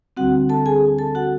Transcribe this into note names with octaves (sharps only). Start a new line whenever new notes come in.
D2 D3 G3 C4 F#4 F#5
A4 A5
G#4 G#5
A4 A5
F#4 F#5